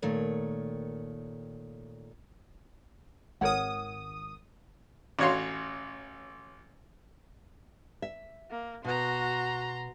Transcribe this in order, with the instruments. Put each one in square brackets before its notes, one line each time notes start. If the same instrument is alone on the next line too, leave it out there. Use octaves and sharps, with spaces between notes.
[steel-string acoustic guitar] A#2 D#3 A3 C#5
[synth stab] G#1 D#6 [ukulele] A#4 C#5 F#5
[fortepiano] A1 F#4 C#5 F5 C6
[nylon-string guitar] E5
[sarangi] A#3
[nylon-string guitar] B2 [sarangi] F#4 [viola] A#5 C6